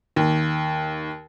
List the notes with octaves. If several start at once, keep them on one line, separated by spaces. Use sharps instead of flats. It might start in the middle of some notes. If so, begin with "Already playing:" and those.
D#2